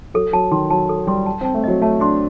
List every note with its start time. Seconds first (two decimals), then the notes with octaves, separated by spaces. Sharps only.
0.14 F#3 A4
0.33 F#3 A5
0.51 D#3 C6
0.71 F#3 A5
0.89 A4
1.07 G3 C6
1.26 A5
1.41 C4
1.45 A5
1.54 A3
1.64 F#3 D#5
1.82 A3 A5
2.00 D4 C6